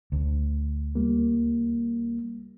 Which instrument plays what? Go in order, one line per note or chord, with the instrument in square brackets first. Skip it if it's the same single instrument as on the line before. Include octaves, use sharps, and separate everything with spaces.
[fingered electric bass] D2
[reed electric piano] C#2 G3 A#3